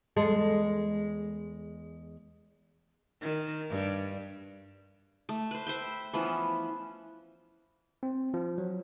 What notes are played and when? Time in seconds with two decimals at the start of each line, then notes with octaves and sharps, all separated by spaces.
0.17 E2 G#3 A4
3.21 D#3
3.70 G2
5.29 A3
5.51 B4 C5
5.67 C5 E5 G5
6.13 E3 F3 B3 C#4
8.03 C4
8.34 F3
8.58 F#3